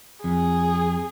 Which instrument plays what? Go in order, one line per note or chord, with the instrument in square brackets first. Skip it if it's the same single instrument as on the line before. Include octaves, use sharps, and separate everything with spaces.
[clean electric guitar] F2 [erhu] G#4